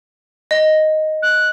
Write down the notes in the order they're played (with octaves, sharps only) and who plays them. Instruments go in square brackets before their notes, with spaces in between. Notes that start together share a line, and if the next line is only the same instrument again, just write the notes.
[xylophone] D#5
[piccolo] F#6